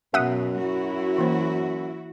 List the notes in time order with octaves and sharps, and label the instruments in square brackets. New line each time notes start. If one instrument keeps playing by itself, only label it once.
[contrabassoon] F#2 [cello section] B2 F#3 [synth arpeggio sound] E5 F#5 D#6
[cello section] E4 F#4
[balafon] E3 A#3 C5